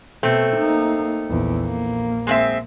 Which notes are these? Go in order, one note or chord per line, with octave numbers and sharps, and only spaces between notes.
B2 A3 C4
A#3 D#4
A#1 E2
A#1 A#3
G#3 C4 E5